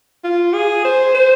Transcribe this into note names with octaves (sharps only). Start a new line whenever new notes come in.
F4
G#4
C5
C5